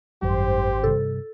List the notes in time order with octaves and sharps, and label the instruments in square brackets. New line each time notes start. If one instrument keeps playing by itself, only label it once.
[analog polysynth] G#1 C5 [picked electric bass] F#2 F#3 G3 [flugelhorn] G4
[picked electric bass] G2 C3 G3 [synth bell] A4